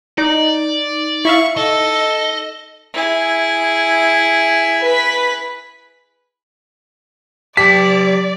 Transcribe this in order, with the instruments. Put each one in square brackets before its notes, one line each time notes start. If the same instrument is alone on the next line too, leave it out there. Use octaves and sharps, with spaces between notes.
[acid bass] D#4 [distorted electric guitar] D5
[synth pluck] E4 E5 F5 [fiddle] C#6
[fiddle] A4 [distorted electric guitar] D#5
[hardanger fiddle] E4 G#4
[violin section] B4 B6
[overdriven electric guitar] F#3 A5 [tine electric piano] G4 [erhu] D5 [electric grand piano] B6